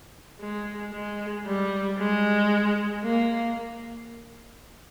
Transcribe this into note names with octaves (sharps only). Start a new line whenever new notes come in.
G#3
G#3
G3
G#3
A#3